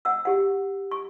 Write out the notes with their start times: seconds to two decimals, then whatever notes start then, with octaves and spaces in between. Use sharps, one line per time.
0.05 F#5 E6
0.25 G4 F#5
0.91 C#6